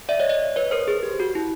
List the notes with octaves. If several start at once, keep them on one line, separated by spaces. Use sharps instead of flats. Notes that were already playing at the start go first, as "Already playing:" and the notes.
D5 E5
C#5 D#5
C#5 D#5
B4 C#5
A#4 C5
G#4
G4
F#4
E4